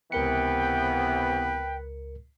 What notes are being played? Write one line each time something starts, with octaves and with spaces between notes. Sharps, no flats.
C#2 C3 E3 B3 A#4 B4 G5 C#7